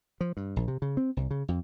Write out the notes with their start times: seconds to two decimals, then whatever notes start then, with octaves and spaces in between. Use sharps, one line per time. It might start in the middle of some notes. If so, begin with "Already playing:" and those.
0.21 F3
0.37 G2
0.56 A#1
0.68 C3
0.82 C#3
0.97 C4
1.17 C2
1.31 C#3
1.48 F2